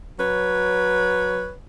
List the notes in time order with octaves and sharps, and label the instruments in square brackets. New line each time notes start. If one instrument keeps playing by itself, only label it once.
[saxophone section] F#3 B4 C#5